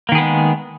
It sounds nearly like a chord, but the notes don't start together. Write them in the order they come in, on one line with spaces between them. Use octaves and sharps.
A#3 D#3 G#4 B3 G#3